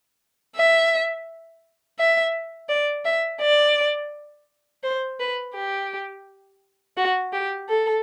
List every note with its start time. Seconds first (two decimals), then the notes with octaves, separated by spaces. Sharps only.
0.56 E5
1.99 E5
2.69 D5
3.05 E5
3.41 D5
4.83 C5
5.20 B4
5.54 G4
6.97 F#4
7.33 G4
7.69 A4